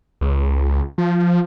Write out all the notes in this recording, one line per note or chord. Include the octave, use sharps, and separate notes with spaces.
C#2
F3